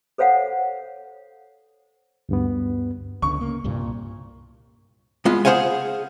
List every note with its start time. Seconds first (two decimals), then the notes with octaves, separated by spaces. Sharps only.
0.18 A4 C5 C#5 F5 F#5
2.29 D2 G2 B3
3.22 C#2 D3 C#6
3.41 C#3 A#3
3.64 C2 G2 A#2
5.25 G#3 B3 F4
5.45 G#4 A4 C5 F5 F#5 G#5